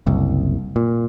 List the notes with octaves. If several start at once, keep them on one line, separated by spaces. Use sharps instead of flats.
F#1 C2
A#2